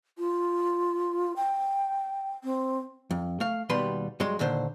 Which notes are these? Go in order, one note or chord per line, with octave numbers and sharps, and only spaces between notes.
F4
G5
C4
F2
A3 F5
D#2 B2 G3 B4 C6
G2 F#3 G#3 C6
D#2 A#2 D3 C5